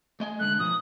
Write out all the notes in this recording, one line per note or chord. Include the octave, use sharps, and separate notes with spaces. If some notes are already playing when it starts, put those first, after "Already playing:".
A3 D#5 G#5
D3 G#3 A3 F#6
B2 F3 B3 D#6